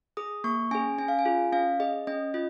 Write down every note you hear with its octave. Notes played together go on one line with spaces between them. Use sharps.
G#4 D#6
A#3 C#6
C#4 G#4 G#5
C#4 G#5
F5
G#5
F4 G#4
C#4 F5
G#4 D#5
C#4 D#5
F4 D#5